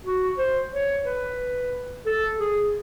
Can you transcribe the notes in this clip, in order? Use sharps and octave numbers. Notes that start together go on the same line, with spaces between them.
F#4
C5
C#5
B4
A4
G#4